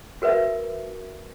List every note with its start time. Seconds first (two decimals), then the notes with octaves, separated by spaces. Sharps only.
0.22 F#4 A#4 B4 E5